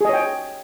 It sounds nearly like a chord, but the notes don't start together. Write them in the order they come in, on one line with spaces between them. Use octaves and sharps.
G#4 D#5 C#5 G5